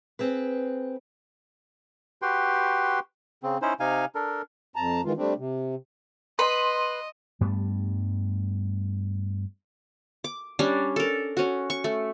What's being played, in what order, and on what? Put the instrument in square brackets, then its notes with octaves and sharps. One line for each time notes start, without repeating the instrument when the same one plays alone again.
[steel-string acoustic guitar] C4 G#4 B4
[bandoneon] F#4 G4 B4 G5 C6
C#3 C4
C#4 D#4 E4 C5
C3 D#4 F5 G#5
D4 A4 A#4
[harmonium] F2 A5 A#5
D#3 E3 G#3 F4
G3 A3 C4 D4
C3
[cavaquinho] B4 B5 [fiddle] D#5 [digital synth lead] C6
[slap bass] G2 G3 A3 B3
[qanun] D6
G3 C#4 D4
A4 A#4
C#4 F#4
C#6
A3